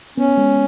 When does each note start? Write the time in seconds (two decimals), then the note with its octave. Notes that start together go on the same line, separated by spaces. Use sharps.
0.18 B3 C#4
0.37 G#3